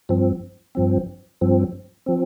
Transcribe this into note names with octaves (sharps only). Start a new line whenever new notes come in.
G2 F3 C4
G2 F3 C4
G2 F3 C4
F3 C4